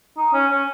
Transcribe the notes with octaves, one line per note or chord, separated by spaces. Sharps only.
D#4
C#4
C#4